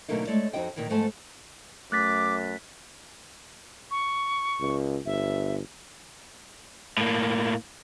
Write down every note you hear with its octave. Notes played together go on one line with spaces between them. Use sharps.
B2 D3 F#3 A3 A#3 D#4
G#3 A3 C#5 D5
F2 D#4 F#4 D#5 G5
A#2 D#3 E3
F2 G#2 A3 B3 G#5 A5
F#2 A3 D6 F#6 A6 B6
C#6
C#2
G1 E5
A2 A#3